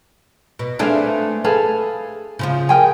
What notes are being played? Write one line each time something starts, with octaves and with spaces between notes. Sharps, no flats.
B2
A3 C4 D4 G#4 B4 F5
G#4 A4 B4 F5
C#3 F3 F4
G#4 A#4 G5 G#5